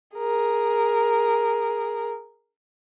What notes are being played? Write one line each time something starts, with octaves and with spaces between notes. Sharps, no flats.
G#4 A#4